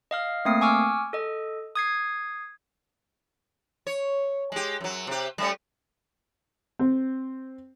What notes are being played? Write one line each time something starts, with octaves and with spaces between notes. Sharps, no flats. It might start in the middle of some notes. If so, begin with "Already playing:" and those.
D#5 F5 F6
A3 A#3 C4 D#6 C7
G#5 C#6 D6 E6 F6
A4 D#5
D#6 G#6 C7
C#5
G#3 G4
F#2 F#3
C3 G4
G3 A3 C#4
C4